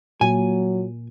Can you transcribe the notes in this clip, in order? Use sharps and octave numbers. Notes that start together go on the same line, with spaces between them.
A#2 F#3 G#5